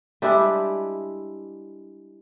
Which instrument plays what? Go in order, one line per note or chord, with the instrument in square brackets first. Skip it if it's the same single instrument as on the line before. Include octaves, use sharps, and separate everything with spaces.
[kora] G3 G#3 D4 E4